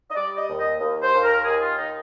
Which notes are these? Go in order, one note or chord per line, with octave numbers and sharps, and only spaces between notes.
D#5
G3 D5
D#5
D#2
D#5
D#2
C5
D#2
A#4
D#3 G#4
F4
D#2 D#4